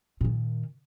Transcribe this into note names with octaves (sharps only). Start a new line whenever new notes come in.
A#2 D#3